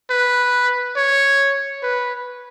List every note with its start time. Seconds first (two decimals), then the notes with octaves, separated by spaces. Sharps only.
0.10 B4
0.97 C#5
1.83 B4